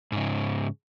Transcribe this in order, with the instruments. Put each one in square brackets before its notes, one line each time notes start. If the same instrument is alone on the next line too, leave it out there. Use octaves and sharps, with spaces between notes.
[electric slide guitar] G#2 C#3